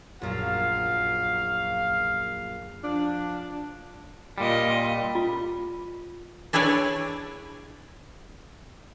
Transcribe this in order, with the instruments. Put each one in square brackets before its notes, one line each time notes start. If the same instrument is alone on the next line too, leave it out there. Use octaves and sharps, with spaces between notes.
[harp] A#1 F#2 [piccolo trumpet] F5
[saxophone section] F3 D4
[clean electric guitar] A#2 G3 [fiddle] F4 D#5
[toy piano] F4
[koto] D4 E4 G#4 B4 C#5 D5